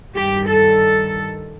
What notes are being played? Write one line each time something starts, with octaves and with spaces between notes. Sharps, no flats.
G2 D#3 G4
A4